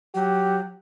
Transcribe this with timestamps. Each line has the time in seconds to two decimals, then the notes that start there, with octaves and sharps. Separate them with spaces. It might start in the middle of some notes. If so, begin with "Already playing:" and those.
0.15 F#3 G4